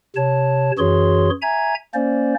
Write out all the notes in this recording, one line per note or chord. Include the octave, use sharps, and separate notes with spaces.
C3 C#5 A5
F#2 E3 F#4 G#4 C#5 C6
E5 G#5 A#5 G#6
A#3 C#4 C5 D5